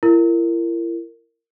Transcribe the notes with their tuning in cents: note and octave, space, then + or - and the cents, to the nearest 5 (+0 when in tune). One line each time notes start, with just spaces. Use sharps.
E4 +40 A#4 -20